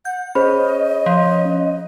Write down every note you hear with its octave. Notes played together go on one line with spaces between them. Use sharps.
F#5 G6
C#4 G#4 C5 D#5 B5
F3